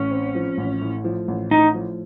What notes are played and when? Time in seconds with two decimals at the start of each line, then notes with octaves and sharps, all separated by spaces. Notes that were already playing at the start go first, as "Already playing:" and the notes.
Already playing: A1 C#4
0.11 C4
0.35 F3
0.57 A1
0.81 A2
1.04 F3
1.28 A1
1.51 A2 D#4
1.74 F3